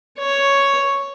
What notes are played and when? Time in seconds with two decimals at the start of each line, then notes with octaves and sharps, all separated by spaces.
0.20 C#5